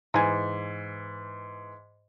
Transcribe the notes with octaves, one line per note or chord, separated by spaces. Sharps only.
G#2 E3 G#5 A#5